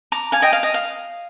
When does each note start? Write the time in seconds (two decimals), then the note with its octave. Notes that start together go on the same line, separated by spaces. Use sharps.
0.12 A#5 D6
0.32 F5 G#5
0.42 D#5 G5
0.53 F5
0.63 D#5
0.74 F5